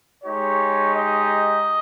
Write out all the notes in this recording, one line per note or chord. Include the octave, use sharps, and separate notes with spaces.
G#3 D#4 G4 C#5
D#5